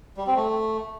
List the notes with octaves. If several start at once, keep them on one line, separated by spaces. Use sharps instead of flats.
G3
C4
A3